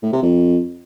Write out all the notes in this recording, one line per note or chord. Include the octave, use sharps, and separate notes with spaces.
A2
C3
F2